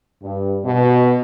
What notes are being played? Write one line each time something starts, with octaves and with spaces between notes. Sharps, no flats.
G2
B2